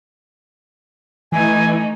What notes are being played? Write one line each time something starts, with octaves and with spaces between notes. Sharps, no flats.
E3 A3 D#4 G#5